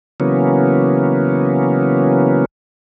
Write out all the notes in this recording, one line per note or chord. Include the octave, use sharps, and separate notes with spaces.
C#3 E3 F#3 A#3 B3 C#4